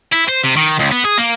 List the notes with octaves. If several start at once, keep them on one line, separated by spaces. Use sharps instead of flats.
E4
C5
C3
D#3
C#2
B3
G#4
A#3